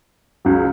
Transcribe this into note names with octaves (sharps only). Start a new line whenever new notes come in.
C#2 C#3 F#3